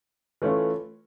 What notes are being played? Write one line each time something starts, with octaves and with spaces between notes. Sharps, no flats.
E3 A3 C#4 F4